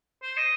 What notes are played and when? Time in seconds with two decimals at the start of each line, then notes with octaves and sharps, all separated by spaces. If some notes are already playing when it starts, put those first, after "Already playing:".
0.23 C5
0.37 D#5